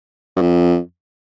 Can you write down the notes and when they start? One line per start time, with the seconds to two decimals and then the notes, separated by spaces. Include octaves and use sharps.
0.37 F#2
0.42 F2